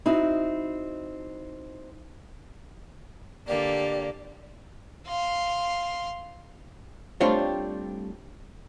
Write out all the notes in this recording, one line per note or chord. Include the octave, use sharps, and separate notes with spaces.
C4 D#4 E4 F#4
D3 A#3 G4 D5
F5 C6
G3 A3 C4 D4 F4 C#5